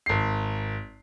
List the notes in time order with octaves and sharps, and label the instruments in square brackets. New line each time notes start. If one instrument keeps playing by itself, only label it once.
[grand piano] G#1 C7